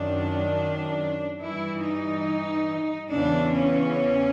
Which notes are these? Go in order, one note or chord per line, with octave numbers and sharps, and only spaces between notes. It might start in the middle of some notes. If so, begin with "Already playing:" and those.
Already playing: F#2 D#3 D4
G2 E3 E4
D#4
E2 C#3 E3 D4
C#4